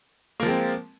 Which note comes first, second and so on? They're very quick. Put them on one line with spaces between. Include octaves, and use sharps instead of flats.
A#3 F3 G#3 C4